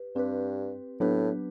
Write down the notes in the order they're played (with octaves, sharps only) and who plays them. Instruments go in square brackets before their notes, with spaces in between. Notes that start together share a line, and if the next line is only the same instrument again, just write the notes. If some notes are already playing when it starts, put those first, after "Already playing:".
Already playing: [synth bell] G4 B4
[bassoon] G2 [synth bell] C4 G4 B4
[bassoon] A2 [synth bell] F#3 B3 D4 G4 B4